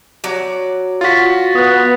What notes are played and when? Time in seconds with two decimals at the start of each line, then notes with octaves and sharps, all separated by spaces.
0.24 F#3 D5
1.01 F4 F#4 A6 B6
1.55 B3 D#6 F#6